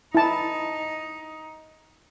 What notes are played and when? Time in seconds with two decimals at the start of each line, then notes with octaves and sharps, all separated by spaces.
0.15 D#4 E4 A5